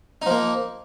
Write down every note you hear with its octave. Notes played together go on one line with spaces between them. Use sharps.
F3 A#3 D#4